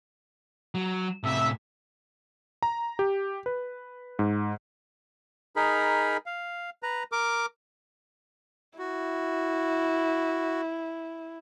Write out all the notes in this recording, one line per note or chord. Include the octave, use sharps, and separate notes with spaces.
F#3
A2 C3 E5
A#5
G4
B4
G#2
D#4 G#4 A#4 B5
F5
B4 A#5
A#4 D6
E4 F#4